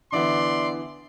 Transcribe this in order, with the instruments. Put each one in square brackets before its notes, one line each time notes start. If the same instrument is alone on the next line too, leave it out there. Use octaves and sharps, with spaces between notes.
[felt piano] D3 E3 B3 [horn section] D5 E5 C6